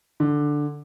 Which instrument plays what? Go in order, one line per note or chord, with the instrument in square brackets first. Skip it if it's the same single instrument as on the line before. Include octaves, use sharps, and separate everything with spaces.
[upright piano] D3